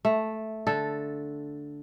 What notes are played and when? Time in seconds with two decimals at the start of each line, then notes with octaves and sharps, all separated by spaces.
0.05 A3
0.67 D3 A4